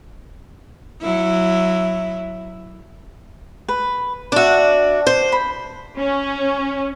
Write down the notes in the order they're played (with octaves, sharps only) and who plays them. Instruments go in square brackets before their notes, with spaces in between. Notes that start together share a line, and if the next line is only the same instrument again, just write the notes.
[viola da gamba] F#3 E4
[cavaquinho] B4
[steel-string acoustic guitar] D4 F#4 [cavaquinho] D5 E5
[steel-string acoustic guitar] C5
[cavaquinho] B5
[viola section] C#4